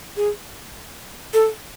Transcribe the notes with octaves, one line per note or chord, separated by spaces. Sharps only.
G#4
A4